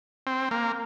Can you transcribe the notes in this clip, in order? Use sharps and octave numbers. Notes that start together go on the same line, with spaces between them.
C4
A#3